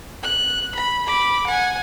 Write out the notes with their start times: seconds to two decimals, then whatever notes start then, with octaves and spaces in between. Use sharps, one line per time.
0.23 F#6
0.75 B5
1.05 B5 D6
1.47 F#5 G#5